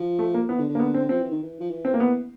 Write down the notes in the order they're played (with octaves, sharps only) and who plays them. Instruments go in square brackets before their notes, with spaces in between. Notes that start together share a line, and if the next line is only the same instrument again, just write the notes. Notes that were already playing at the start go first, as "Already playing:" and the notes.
Already playing: [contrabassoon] F3
[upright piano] A3
A#3
[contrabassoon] E3 [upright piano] B3
[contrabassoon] D3
D3
[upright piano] A#3
B3
C4
[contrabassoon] F3 [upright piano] C4
[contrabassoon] E3
D#3
E3
F3
E3
[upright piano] C4
A#3
B3